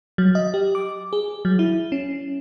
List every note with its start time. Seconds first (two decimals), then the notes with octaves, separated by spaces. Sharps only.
0.18 F#3
0.35 D#5
0.54 G4
0.75 D6
1.13 G#4
1.45 F#3
1.59 E4
1.92 C#4